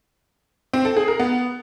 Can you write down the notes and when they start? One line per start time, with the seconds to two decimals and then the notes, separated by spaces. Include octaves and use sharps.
0.73 C4
0.85 A4
0.96 G#4
1.08 A#4
1.20 B3